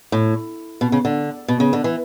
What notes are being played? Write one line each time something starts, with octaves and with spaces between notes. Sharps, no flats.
A2
B2
C#3
D3
B2
C#3
D3
E3